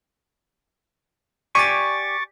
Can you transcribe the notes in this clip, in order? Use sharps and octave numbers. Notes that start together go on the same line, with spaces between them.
G4 D5 G#5 C#6 D6 A6